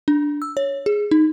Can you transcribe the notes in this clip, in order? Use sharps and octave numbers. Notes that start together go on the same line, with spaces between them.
D4
E6
C#5
G#4
D#4